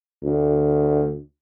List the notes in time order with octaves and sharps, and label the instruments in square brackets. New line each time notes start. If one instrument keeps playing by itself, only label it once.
[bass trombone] D2